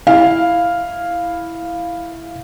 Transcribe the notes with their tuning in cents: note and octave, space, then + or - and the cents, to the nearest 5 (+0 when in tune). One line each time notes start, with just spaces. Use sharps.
E4 +0 F5 +0